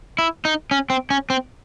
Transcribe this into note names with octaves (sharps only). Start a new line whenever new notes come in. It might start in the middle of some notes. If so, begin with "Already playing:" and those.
E4
D#4
C#4
C4
C#4
C4